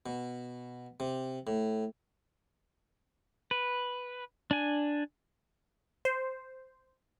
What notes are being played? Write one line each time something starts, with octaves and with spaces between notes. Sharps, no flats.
B2
C3
A2
B4
D4 G#5
C5